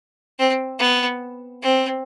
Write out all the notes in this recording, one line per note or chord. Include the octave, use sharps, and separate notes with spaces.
C4
B3
C4